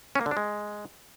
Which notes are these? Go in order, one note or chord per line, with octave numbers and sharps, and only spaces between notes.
C#4
A#3
D3
D4
G#3